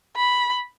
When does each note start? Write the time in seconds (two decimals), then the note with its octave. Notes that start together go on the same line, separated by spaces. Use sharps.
0.16 B5